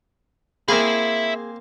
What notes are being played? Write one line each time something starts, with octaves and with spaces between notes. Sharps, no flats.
A#3 C4 G#4 E5 F5 B5